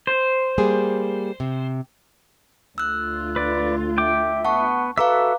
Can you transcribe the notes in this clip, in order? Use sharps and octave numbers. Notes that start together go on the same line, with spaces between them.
C5
G3 A#3 G#4
C3
D2 F4 E6 F#6
B4 D5
E5 G5 D6
B3 F#5 A5 C#6
F#4 A4 B4 E5 F5 A#5 D6